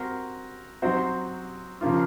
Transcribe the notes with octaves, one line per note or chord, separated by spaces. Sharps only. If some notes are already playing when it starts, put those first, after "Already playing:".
Already playing: C4 F#4 A#4
F#3 C4 D#4 F#4 C5
C#3 F3 A#3 C#4 F4